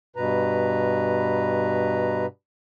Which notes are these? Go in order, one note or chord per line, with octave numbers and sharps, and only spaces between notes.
G2 B2 B4 A#5